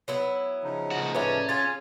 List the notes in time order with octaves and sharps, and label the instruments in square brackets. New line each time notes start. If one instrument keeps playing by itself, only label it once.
[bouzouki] F#3 B3 E4
[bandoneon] C#3 F3 D#4
[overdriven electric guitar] C#2 F#4
[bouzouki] A2 D4 [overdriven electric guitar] C#4 [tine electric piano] B4 E5
[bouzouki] F4 G#4 [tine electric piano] G#6 A6